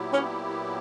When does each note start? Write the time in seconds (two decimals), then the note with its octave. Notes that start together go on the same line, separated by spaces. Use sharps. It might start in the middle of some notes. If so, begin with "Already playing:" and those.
Already playing: A#2 F#3 B3 E4 G4
0.12 C#4